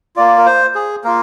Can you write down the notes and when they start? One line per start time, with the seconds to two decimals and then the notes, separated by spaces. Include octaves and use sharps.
0.16 A#3 F4 D5
0.38 A#4
0.46 C5
0.75 G#4
1.04 A#3 F4 A#4